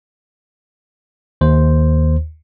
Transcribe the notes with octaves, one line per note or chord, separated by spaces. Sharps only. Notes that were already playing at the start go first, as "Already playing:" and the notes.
D#2 C5